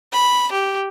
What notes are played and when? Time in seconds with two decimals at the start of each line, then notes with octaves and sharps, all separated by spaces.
0.13 B5
0.52 G4